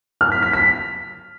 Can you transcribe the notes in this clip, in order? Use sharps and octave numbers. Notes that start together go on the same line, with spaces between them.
F6
B6
B6
B6